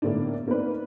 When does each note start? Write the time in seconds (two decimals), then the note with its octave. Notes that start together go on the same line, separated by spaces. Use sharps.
0.02 A2 D3 A#3 B3 D4
0.47 A#3 C4 D#4 B4 D5